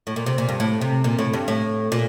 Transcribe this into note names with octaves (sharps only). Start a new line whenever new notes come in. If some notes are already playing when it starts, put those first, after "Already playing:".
A2
A#2
C3
A#2
G2
A2
C3
A#2
A2
G2
A2
A#2